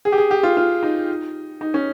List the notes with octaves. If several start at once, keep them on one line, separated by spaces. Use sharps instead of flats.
G#4
G4
G#4
G4
F4
F4
D#4
D#4
C#4